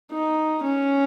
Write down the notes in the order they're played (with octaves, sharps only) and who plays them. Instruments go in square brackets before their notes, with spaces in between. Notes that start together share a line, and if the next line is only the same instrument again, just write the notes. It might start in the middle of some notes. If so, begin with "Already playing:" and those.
[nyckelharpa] D#4
C#4